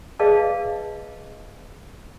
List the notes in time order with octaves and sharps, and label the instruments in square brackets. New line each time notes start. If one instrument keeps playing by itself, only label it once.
[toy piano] G#4 B4 D5 D#5 F5 A5